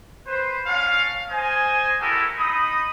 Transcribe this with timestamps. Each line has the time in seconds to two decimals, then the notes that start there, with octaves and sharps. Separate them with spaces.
0.26 B4 C5
0.66 C#4 D4 F5
1.29 C5 D#5 G#5
2.00 E4 F#4 G4 A4 A#4
2.38 D#4 D#5 B5 D#6